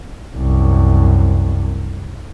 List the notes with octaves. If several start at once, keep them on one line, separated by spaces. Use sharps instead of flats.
C2 F#2